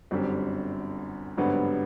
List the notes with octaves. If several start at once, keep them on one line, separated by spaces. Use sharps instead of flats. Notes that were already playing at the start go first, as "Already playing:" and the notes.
G1 F#2 D3 G3 C4
G#1 G2 D3 F#3 B3